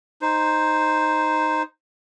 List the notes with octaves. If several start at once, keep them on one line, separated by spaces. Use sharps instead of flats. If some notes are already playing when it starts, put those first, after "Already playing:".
D#4 C5